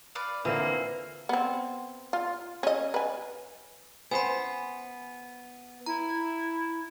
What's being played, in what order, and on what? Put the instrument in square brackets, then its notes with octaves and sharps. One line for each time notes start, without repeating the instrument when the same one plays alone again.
[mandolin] B4 D5 F5
[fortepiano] A#2 D3 C4 [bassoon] E3 [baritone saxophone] A#3 [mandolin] E5
[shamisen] B3 C4
F4
C#4 D#5
B4 G#5
[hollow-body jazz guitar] B3 C5 [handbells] G#5 B5
[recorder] E4 [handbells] A#5